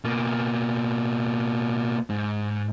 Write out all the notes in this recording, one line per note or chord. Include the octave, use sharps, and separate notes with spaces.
B2 A#3
G#2